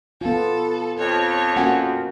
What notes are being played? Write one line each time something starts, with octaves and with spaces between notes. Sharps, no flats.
B3 F4 A4
F2 C#5
A#3 C#4 F#4 F#5 G#5